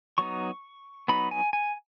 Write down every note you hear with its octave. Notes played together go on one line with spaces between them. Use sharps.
F#3 B3 D#4 C#6
F#3 B3 D#4 B5
G#5
G#5